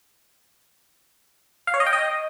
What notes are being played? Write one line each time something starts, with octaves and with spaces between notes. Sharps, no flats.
F5
C#5
D#5
G5
D#5